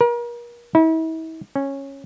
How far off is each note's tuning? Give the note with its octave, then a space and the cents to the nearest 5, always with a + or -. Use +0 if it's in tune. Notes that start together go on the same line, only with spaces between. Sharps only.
A#4 +40
E4 -40
C#4 -10